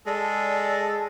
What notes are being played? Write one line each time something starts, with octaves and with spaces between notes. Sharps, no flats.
G#3 A4 D5 A5